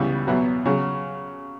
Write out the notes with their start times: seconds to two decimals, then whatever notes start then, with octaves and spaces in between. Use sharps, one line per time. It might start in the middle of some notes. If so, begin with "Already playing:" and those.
Already playing: C#2 C#3 E3 G3 B3
0.27 E2 B2 F#3 B3
0.65 C#3 F#3